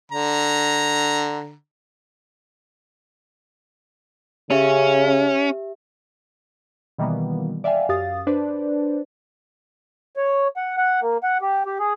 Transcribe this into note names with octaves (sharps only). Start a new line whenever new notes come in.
D3 A#5
C#3 C#4 G4 E5
B2 D#3 E3 G3 A#3 B3
D5 E5 F5 G5 G#5
F#2 G4 F5 D#6 A6
D4 B4 C5 D5
C#5
F#5
F#5
A#3
F#5
G4
G4
G#4